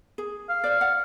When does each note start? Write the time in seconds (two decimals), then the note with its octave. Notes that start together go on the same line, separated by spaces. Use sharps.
0.18 G#4
0.49 F5
0.64 C5 D5
0.81 F#5